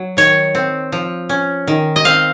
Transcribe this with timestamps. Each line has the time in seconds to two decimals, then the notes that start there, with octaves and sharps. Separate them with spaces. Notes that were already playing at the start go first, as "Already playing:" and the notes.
Already playing: F#3
0.17 D#3 C#5
0.55 C4
0.92 F3
1.29 C#4
1.67 D#3
1.96 D#5
2.05 C4 F5